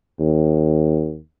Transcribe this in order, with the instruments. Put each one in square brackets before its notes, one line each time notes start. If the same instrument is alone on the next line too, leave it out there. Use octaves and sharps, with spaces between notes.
[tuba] D#2